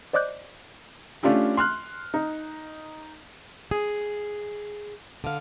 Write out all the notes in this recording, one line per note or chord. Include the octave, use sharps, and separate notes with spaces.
C5 D5 D#5 D6 F#6 G6
A3 C#4 D4 F4 G4
C6 F6 F#6
D#4
G#4
D3 F5